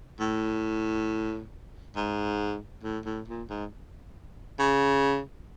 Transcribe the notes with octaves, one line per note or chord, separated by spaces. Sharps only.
A2
G#2
A2
A2
A#2
G#2
C#3